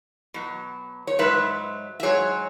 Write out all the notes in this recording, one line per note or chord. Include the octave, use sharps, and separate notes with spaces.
B2 F#3
C#5
G#2 F#3 B4 E5
E5
G#2 F#3 G#4 C#5